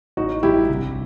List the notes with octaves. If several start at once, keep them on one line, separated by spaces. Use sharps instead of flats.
A1 D#4 F#4
G2 E4 G4
C2